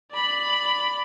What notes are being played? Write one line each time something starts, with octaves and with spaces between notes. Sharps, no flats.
D5 B5